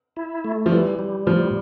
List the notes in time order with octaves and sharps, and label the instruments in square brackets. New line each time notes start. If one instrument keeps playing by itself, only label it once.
[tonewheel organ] E4
A3
[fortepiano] F3
[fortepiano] E3 [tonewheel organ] G3
[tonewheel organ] G3
[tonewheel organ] A2 [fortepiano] F3